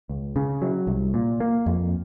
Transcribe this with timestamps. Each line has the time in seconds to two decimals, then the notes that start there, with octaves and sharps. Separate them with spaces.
0.09 C#2
0.36 C#3
0.62 F#3
0.87 C2
1.14 A#2
1.40 A#3
1.66 F2